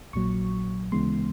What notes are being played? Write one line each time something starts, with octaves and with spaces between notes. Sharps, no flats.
A#1 A#2 F#3 C#6
D2 C#3 E3 G#3 B3 C6